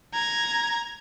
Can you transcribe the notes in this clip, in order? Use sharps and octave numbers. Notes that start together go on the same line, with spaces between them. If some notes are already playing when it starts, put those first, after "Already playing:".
A#5 G#6